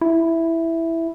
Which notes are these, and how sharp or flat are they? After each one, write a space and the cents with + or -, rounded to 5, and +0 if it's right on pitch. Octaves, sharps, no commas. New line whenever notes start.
E4 +0